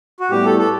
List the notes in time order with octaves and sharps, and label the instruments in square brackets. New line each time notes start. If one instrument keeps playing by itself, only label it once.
[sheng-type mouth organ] F#4
[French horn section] A2 G3 B3 E4 [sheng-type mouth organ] G4
[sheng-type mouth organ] A4
A4